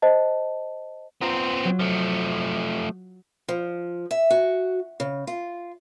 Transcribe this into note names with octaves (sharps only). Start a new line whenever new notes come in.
C5 D#5 A5
B3 C4 F4 A#5 C6
F#3
F3 A3
F3
E5
F#4
C#3
F4